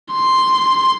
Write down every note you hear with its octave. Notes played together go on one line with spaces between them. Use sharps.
C6